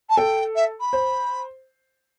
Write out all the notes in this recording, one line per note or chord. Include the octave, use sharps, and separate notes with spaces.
A5
A4 G5
E5
B5
C5